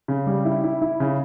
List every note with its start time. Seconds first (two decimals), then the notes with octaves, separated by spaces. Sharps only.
0.08 C#3
0.27 G3
0.45 E4
0.64 E4
0.81 E4
1.00 C#3